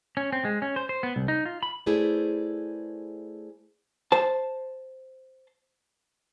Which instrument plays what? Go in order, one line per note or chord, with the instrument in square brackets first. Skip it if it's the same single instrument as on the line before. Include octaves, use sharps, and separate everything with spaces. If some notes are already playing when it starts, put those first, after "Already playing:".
[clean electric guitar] C#4
C4
G#3
C#4
C5
C5
B3
C2
D#4
F4
B5
[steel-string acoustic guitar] A3 E4 G#4 B4 C5 D5
[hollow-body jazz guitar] C5 A5